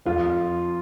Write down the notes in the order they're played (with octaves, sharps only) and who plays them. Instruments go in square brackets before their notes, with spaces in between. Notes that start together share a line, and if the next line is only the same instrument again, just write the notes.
[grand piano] F2 F4